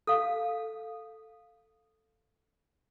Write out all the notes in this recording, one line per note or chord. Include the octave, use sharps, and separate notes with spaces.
A4 F5